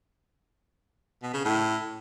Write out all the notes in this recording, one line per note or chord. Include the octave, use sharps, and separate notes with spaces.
B2
C#3
A2